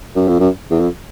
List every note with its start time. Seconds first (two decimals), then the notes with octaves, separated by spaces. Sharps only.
0.16 F#2
0.28 F2
0.40 F#2
0.71 E2
0.80 F2